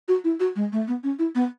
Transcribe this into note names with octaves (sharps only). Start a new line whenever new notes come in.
F#4
E4
F#4
G#3
A3
B3
C#4
E4
B3